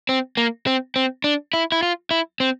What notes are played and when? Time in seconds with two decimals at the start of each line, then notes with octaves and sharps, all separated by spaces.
0.09 C4
0.37 A#3
0.67 C4
0.96 C4
1.24 D4
1.54 E4
1.72 E4
1.83 F4
2.11 E4
2.40 C4